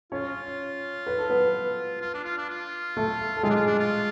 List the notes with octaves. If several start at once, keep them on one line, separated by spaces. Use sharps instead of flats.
C#4 F4 C#5
B4
A4
B3 B4
F4
D4
F4
D4
F4
A3 A4
A4
G#3 F4 G#4
D4
F4
D4
F4